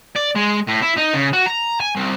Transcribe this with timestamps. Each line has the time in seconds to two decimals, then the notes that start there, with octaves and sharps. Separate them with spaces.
0.16 D5
0.35 G#3
0.67 A2
0.82 E4
0.97 D#4
1.14 C#3
1.33 F#4
1.46 A#5
1.80 G#5
1.96 C2